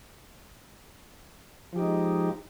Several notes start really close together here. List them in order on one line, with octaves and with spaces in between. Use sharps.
F3 G4 D#4 G#3